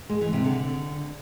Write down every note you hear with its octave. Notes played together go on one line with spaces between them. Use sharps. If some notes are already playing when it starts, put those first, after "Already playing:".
G#3
E3
C3
D3